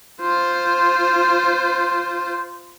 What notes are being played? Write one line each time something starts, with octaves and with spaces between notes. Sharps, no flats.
F4 C5